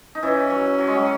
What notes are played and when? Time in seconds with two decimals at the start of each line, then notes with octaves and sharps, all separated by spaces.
0.15 D#4
0.23 E3 C#4 E4
0.50 F#3
0.78 F#3
0.87 G#3
0.94 F#3